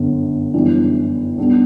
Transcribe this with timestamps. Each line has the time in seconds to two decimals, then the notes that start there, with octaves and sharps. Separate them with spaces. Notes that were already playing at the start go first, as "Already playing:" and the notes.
Already playing: G1 F#2 D3
0.53 G1 F#2 E3 G3 D4
1.38 B1 B2 G3 D4